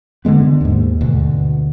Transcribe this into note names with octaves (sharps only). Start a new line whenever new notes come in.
D3 E3 G#3 B3
D#2 G#2
D2 B2